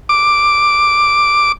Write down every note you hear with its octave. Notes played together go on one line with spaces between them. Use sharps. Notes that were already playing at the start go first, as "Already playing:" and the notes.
D6